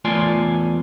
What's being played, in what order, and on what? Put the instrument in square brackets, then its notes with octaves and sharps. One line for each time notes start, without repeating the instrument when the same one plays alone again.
[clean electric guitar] E2 A3 F4 D5 G#5 C6